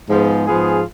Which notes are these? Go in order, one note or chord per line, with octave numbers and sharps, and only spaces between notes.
G#2 F3 B3 F4 G#4
G#2 F3 B3 F4 G#4